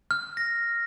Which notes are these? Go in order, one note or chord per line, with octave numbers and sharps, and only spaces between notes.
F6
A#6